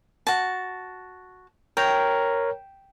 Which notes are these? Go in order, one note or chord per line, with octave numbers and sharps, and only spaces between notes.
F#4 A5
A#4 C#5 G5 A#5